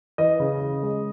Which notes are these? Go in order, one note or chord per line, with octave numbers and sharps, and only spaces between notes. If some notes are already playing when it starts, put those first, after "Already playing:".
E3 D#5
C#3
C#3
G#3